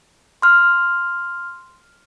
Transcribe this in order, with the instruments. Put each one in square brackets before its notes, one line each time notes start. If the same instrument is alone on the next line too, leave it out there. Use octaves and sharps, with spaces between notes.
[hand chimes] C6 F6